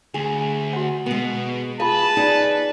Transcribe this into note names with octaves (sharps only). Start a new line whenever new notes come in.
D2 G#4
F#4 F#5
B2 G#3 B3
F4 G#4 B4 F5 A5
D#4 G#4 D5